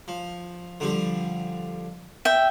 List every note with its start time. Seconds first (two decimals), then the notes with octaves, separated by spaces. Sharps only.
0.08 F3
0.80 D3 F3 G3
2.25 E5 G5